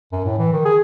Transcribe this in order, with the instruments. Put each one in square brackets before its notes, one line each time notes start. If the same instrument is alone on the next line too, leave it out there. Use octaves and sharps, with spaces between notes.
[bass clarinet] F#2
A2
E3
D#3
G#4